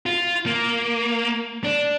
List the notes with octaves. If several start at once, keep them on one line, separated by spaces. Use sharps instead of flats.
F4
A#3
D4